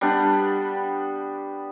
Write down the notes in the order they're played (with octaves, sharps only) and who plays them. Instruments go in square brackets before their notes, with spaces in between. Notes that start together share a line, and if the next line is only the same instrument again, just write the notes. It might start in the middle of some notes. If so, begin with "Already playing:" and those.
[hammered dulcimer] G3 B3 D4 G4